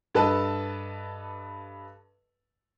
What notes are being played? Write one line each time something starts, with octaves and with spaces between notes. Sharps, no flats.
G2 A4 B4 D#5 A5